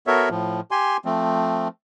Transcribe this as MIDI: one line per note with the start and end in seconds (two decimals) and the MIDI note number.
0.07 0.29 59
0.07 0.29 66
0.07 0.29 69
0.07 0.29 70
0.07 0.29 73
0.07 0.29 76
0.30 0.61 45
0.30 0.61 53
0.71 0.97 67
0.71 0.97 80
0.71 0.97 84
1.05 1.68 53
1.05 1.68 57
1.05 1.68 60